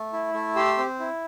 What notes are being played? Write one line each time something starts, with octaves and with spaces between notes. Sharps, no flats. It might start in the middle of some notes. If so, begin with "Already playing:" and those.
Already playing: A3
E4
A3
G4 C6 E6
C4
E4